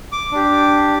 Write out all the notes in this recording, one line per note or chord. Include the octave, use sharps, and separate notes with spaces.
D6
D4 G4